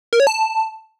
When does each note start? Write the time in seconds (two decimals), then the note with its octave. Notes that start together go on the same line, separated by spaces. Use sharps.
0.13 A#4
0.20 C#5
0.27 A5